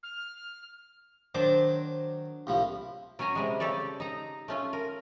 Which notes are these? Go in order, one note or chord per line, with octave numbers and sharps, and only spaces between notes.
F6
D#3 F#3 D4 C5 D6
C2 A2 F3
F#3 C#4 C#5 G#5 A#5
C3 G3 G#3
C#3 G4 A4 C#5 D5
D#4 A#5
A3 C#4 F4
A#4